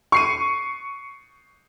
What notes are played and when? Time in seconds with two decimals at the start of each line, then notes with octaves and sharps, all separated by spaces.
0.12 C#6 C7 D#7